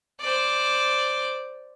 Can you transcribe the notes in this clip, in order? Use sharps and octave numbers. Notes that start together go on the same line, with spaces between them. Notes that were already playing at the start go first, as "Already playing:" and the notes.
C5 D5